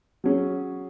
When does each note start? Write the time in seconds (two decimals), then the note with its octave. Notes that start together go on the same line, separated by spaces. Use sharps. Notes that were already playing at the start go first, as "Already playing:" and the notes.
0.24 F#3 C#4 G#4